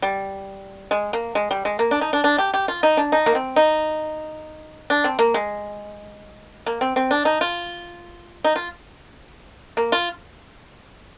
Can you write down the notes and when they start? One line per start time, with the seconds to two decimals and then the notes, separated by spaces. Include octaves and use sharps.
0.02 G3
0.91 G#3
1.13 A#3
1.35 G#3
1.51 G3
1.65 G#3
1.79 A#3
1.91 D4
2.01 D#4
2.13 D4
2.24 D4
2.38 G4
2.54 G4
2.68 F4
2.83 D#4
2.97 D4
3.12 D#4
3.26 A#3
3.35 C4
3.56 D#4
4.90 D4
5.04 C4
5.19 A#3
5.34 G#3
6.66 A#3
6.81 C4
6.96 C4
7.11 D4
7.25 D#4
7.41 F4
8.44 D#4
8.56 F4
9.77 A#3
9.92 F4